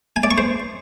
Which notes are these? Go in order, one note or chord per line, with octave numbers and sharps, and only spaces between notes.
G#5
D5
C#6
C5